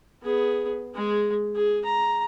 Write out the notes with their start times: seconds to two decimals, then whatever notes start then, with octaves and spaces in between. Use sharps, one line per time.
0.23 B3 G#4
0.95 G#3 G#4
1.55 G#4
1.85 A#5